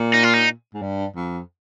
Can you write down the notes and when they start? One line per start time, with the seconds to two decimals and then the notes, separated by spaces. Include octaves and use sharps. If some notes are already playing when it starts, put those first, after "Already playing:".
Already playing: A#2
0.14 D#4
0.23 F4
0.34 D#4
0.74 G#2
0.82 G2
1.16 F2